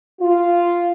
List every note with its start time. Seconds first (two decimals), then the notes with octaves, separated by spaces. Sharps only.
0.21 F4